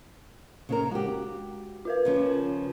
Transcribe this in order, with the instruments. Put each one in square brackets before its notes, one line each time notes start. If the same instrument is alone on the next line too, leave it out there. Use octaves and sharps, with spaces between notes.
[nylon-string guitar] C#3 C4 A#4
[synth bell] G#3 [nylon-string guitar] F#4 G4
[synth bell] F4 A#4 B4
[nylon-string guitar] C#3 F3 C#4